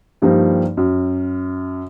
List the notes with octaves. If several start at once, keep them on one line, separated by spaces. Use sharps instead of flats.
G2 F3 G3 A#3 D#4
F#2